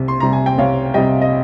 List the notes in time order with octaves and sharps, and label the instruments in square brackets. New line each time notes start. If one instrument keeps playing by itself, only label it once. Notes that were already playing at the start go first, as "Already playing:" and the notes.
Already playing: [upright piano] C2 C3
C6
C3 G3 A#5
G#5
G5
C2 C#5 F5
C3 G3 D#5 G5
D#5